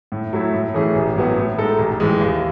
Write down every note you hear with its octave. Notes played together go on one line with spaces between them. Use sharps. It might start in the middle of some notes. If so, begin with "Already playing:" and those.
A2
F#3 A3 E4
A2
E3 A3 C#4 G#4
A1
A2 F#3 B3
A2
G#3 D#4 A4
A1
A2 E3 G#3
D#2